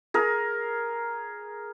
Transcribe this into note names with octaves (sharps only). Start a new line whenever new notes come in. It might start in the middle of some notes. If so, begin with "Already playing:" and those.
G#4 A#4